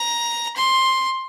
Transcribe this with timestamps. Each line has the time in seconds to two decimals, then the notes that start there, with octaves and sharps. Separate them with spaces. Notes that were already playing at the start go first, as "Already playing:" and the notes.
Already playing: A#5
0.57 C6